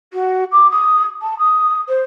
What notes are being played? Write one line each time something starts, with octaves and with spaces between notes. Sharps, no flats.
F#4
D6
D#6
A5
D#6
C5